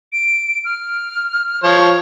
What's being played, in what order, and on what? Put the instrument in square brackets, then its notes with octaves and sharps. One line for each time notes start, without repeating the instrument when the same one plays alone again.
[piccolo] D7
F6
[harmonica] F3 C#5 [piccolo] C6